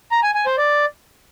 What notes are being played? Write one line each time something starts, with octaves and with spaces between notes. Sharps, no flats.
A#5
G#5
G#5
C5
D5